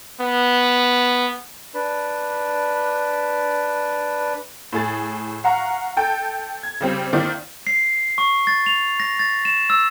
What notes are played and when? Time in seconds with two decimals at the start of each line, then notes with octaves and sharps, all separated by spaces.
0.21 B3
1.74 D4 B4
4.73 A2 G#4 A6
5.44 F5 F#5 A#5 C#6
5.97 A4 G5
6.63 G#6
6.81 C#3 G3 C4
7.13 D#3 A#3 C4 E4 D5
7.67 C7
8.18 C#6
8.47 A6
8.66 F7
9.00 A#6
9.19 A6
9.45 E7
9.70 E6